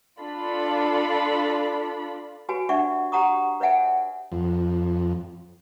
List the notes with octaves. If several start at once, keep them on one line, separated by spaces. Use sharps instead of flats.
D4 F4 A4 B5
F#4 G4 B4 C#5 G#5
D4 D5 E5 F#5 C#6
G4 C#5 F#5 A#5 C#6 D#6
B4 C#5 D5 E5 F#5 G#5
F2